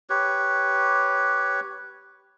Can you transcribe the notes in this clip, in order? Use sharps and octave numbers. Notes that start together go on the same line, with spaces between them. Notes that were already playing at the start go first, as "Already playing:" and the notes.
G4 B4 C#5